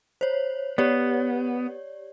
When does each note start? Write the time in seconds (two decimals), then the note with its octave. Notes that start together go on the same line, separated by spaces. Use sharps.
0.21 C5 C#5
0.78 B3 G4 C#5 D5